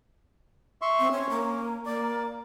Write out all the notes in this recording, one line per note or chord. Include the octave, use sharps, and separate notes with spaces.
E5 C6 C#6
C4
C#4 C#5
A#3
A#3 D5